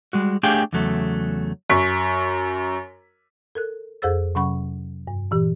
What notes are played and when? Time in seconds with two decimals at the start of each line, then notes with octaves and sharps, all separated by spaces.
0.13 G3 G#3 F#4
0.43 A3 D4 G4 G#4 F5 G5
0.73 E2 C#3 F#3 A3
1.70 F#2 C#6 B6
3.55 A4 A#4 F#6
4.02 F2 G#4 A4 C5 E6 A6
4.35 C3 F#3 C#4 F#5 B5 C#6
5.07 G2
5.31 A#2 E3 G4